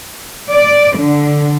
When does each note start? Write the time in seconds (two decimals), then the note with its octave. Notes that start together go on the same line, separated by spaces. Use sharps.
0.51 D5
0.97 D3